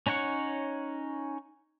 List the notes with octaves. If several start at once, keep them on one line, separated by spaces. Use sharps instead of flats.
C#4 D#4 C#5 F#5 C#6